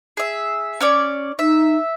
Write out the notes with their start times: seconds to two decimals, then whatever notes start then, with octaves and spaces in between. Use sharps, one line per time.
0.17 G#4 E5
0.80 C#4 C#5 D5
1.39 D#4 E5